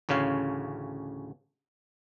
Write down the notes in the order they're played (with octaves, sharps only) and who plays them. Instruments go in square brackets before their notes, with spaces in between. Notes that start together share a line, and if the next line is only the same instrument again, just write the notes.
[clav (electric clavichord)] A1 D2 C#3 C#4 F5